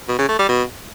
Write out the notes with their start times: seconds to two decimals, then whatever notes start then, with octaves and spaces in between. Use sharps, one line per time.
0.08 B2
0.18 C#3
0.29 A3
0.39 G3
0.49 B2